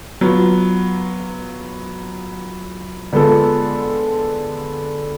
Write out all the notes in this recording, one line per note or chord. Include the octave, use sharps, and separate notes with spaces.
F#3 B3 F4
D3 G#3 B3 F4 A4